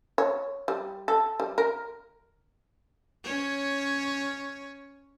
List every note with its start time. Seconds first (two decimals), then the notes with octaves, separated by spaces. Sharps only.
0.18 C#5
0.68 G3
1.08 A4
1.40 G3
1.58 A#4
3.24 C#4 C#5